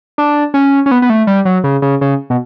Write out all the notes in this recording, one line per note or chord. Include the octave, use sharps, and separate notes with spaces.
D4
C#4
C#4
B3
B3
A3
G3
F#3
C#3
C#3
C#3
B2